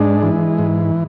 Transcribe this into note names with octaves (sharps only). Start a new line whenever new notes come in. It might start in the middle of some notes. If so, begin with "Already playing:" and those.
Already playing: G#2 G#3 D4
E3
G#2